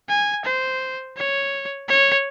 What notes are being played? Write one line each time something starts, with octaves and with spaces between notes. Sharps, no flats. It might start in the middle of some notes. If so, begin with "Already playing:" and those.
G#5
C5
C#5
C#5